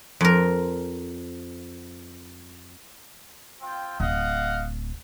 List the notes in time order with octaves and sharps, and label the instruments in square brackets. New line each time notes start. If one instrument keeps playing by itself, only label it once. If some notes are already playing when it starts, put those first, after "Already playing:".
[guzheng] F2 A#4
[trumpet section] C4 F4 G5
[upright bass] D1 [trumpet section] D#5 F5 F#5